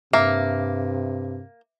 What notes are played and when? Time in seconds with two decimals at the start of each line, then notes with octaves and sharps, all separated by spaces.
0.13 G2 C3 A#3 E5